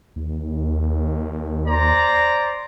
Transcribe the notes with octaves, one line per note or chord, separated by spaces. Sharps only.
D#2
C5 D5 A#5